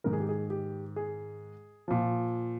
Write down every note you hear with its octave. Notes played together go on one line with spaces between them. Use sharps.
G#2 D#3 A#4
G#4
G4
G#4
G4
G#4
A#2 F3